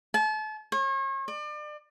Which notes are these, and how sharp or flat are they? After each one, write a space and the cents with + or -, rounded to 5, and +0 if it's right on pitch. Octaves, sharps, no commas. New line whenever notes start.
A5 -35
C#5 -40
D5 +35